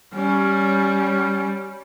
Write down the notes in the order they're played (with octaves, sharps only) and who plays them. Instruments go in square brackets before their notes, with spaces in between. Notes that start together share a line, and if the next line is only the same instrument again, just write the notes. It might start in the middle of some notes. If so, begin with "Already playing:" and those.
[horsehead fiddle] G3 C#4